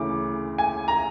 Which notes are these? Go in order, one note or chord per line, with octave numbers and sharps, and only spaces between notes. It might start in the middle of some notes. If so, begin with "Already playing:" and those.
Already playing: D2 C#3 E3 D6
G#5
A#5